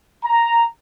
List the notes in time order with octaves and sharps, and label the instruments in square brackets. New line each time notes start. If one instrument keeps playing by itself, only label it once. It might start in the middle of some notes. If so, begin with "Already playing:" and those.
[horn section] A#5